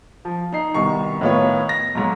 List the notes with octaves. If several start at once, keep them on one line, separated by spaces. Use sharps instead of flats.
F3
D#4 C7
C2 B2 D#3 C#6
A2 D#3 B3 F4 C#5
A#6
B1 G#2